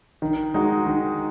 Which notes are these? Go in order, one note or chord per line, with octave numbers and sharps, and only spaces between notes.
D#3
G#3 D#4 F#4
D#3